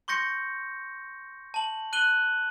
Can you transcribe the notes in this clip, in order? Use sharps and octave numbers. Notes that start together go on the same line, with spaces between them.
C6 C#6 G6 A#6 C#7
A5 F#7
F#6 D#7 F#7 G7